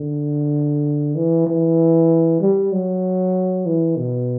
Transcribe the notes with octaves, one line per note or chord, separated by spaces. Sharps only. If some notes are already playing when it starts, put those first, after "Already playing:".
Already playing: D3
E3
E3
G3
F#3
E3
B2